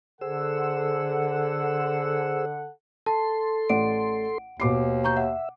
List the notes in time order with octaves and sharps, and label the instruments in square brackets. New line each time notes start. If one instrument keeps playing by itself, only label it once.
[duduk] D3 [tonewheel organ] G#4 C5 E6 [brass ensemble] A4 F#5
[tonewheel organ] A4 C6 [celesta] A5
[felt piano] A1 D5 [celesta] F#5 D7
[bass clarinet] D#2 [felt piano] B2 D6 C7
[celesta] A#5 C#6 G6
[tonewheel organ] E5 [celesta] F#5